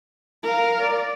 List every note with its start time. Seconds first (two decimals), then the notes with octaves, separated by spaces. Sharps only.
0.43 A#4 F5
0.82 D5